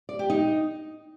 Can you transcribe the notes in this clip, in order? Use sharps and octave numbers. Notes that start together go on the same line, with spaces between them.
D5
G4
D#4